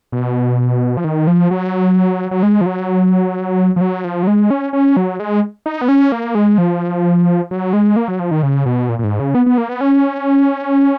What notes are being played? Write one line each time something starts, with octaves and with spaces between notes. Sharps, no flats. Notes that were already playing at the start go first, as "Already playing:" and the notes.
B2
F3
D#3
F3
F#3
F#3
G#3
F3
F#3
F3
F#3
F3
F#3
G#3
C#4
C#4
F#3
G#3
D#4
B3
C#4
A#3
G#3
F3
F#3
G#3
A#3
F#3
F3
D#3
C#3
B2
A#2
A#2
G#2
C#3
B3
B3
A#3
B3
C#4